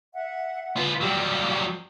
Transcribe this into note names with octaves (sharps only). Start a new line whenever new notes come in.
E5 F#5
F4 B4
F#3 G3 G4 F5